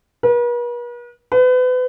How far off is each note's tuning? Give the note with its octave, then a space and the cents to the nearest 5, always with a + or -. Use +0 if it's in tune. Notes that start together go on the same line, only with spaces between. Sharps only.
B4 -45
B4 +35